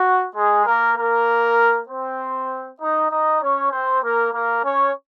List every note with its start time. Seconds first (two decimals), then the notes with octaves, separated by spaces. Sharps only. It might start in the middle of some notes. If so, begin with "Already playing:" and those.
Already playing: F#4
0.35 G#3 G#4
0.66 A#3 A#4
0.96 A#3 A#4
1.88 C4 C5
2.80 D#4 D#5
3.11 D#4 D#5
3.41 C#4 C#5
3.71 C4 C5
4.02 A#3 A#4
4.32 A#3 A#4
4.64 C#4 C#5